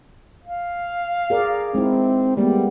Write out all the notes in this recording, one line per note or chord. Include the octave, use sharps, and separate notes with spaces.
F5
G#4 A#4 D5
G#3 C4 D#4 E4
G3 G#3 A#3 B3